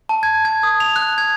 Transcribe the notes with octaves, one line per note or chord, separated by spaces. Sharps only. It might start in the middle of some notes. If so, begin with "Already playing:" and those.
A5
G#6
G#6
D#6
F7
F#6
G#6